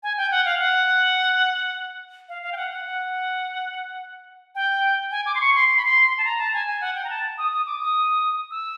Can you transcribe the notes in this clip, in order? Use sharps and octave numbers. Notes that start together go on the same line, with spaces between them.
G#5
G5
F#5
F5
F#5
F5
F5
G5
F#5
F#5
F#5
G5
G#5
D6
C6
C#6
C6
C6
B5
C6
A5
A#5
A5
G#5
G#5
F#5
G5
A#5
A5
D#6
D#6
D6
D#6
E6